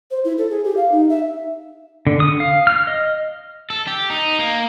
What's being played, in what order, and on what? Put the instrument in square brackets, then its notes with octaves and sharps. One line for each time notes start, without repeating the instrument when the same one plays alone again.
[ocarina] C5
E4
A4
G#4
G4
F5
D#4
E5
[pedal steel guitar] D3
D#6
F5
F6
D#5
[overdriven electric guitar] A4
G4
D#4
A#3